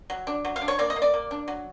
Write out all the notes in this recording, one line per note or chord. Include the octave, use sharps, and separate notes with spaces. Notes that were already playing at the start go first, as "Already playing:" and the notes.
F#3
D4
F#3
F5
D4
C#5
A#3 D5
D#5
A#3
D5
A#3
D4
F#3